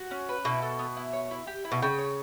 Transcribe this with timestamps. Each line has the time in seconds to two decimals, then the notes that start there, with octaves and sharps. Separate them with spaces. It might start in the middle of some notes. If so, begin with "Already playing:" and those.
Already playing: F#4
0.11 C#4
0.29 B4
0.45 B2 E4
0.62 A4
0.79 B3
0.97 E4
1.13 C#5
1.31 E4
1.47 G4
1.65 E4
1.72 B2
1.82 C#3 G5
1.98 C#5